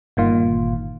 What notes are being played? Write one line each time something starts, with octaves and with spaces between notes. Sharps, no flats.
G1 A#2 D#3 F4